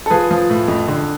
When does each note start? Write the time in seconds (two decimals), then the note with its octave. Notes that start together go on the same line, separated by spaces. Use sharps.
0.06 A4
0.10 F3 G#4 B4
0.31 F3
0.50 A2
0.68 F2
0.88 D3